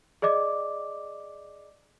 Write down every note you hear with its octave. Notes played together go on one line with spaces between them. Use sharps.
G#4 D5 D#5 D6